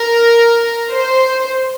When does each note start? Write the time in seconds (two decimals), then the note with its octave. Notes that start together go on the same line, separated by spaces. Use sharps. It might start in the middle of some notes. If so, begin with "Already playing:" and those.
Already playing: A#4
0.91 C5